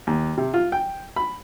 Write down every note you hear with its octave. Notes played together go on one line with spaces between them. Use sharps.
D#2
C3
F4
G5
B5